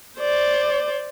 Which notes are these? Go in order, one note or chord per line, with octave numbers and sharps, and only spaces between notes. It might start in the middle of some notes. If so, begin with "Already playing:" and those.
C5 D5